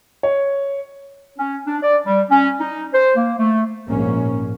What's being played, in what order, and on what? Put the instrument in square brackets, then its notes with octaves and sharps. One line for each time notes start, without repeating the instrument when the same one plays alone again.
[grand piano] C#5
[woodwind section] C#4
D4
D5
G3
C#4
D#4
C5
A#3
A3
[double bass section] A#1 G#2 A#3 C#4